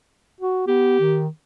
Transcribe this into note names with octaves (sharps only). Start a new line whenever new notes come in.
F#4
B3 G4
D#3